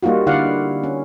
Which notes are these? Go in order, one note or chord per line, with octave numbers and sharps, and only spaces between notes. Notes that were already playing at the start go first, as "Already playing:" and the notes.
G3 A#3 D#4 F4 F#4
D3 E4 D5 F5 F#5
C#4